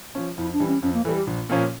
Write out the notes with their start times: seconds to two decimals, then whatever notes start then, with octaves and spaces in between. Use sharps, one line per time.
0.15 F3 C#4
0.37 F2 E4
0.53 D4
0.60 E3 G3
0.68 C#4
0.82 F2 C#4
0.93 A#3
1.05 E3 G3 A4
1.16 G4
1.27 A#1
1.49 A#2 F3 A#3 C#4